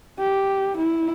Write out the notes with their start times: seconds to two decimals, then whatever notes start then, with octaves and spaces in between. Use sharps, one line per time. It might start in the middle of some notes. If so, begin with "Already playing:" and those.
0.19 G4
0.77 E4